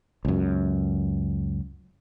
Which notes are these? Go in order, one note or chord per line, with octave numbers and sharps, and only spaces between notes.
C#2 F#2